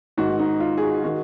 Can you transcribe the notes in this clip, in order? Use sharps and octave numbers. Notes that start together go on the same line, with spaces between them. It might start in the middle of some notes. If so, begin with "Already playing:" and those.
G#2 D#3 F#4
D#4
F4
G#4
F#4
D#3 F#4